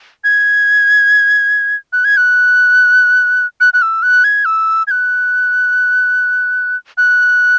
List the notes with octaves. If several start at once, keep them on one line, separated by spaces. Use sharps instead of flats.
G#6
F#6
G#6
F#6
F#6
F#6
E6
F#6
G#6
E6
G#6
F#6
F#6